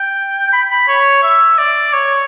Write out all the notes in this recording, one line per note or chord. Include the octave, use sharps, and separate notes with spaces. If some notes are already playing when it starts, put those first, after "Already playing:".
Already playing: G5
B5
B5
C#5
E5
D5
C#5